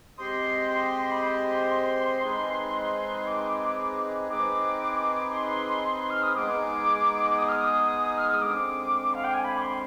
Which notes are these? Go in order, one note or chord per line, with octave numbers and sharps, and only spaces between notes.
G#3 C4 G4 C5 D#5 C6
B5
C6
G#3 C4 D#4 G#4 B4
D6
C4 D#4 G#4 B4 D6
C6
F6
D#6
G#3 B3 D#4 G#4 D6
D#6
F6
D#6
F6
D#6
D3 G#3 C4 D6
F5
G5
G#5
B5
D6
C6